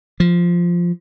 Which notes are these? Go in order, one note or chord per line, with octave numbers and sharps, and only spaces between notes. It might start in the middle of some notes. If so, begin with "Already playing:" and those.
F3